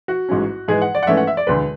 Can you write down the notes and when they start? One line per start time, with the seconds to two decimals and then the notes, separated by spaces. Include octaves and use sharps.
0.08 F#4
0.29 A1 G#2 F#3 C#4
0.68 G#2 E3 G#3 G#4
0.82 F#5
0.95 D5
1.03 F#5
1.07 G#2 E3 A3 C#4 E5
1.17 F#5
1.27 E5
1.37 D5
1.47 E1 D2 D3 B4